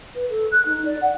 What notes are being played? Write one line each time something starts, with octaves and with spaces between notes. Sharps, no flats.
B4
A4
F#6
D#4
D5
F#5